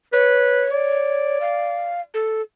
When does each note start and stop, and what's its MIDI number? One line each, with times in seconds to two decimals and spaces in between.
0.13 0.66 71
0.13 1.38 73
0.71 2.08 74
1.41 2.01 77
2.14 2.41 69